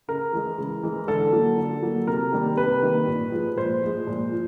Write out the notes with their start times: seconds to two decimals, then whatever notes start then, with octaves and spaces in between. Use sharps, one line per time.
0.08 C#3 A#4
0.33 E3 G#3
0.58 C#3
0.83 E3 G#3
1.08 D3 A4
1.33 F#3 A#3
1.57 D3
1.82 F#3 A#3
2.07 C3 A#4
2.32 D#3 G3 A#3
2.57 C3 B4
2.82 D#3 G3 A#3
3.08 A#2
3.32 F3 G#3
3.57 A#2 C5
3.82 F3 G#3
4.07 A#2
4.32 F3